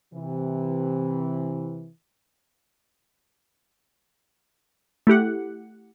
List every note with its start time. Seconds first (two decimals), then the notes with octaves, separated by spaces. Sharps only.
0.13 C3 E3
5.07 A3 E4 G4 F#5